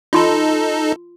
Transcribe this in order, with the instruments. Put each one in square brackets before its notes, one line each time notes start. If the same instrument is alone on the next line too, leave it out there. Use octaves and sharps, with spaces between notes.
[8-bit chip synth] D#4 A4 [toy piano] F4 C6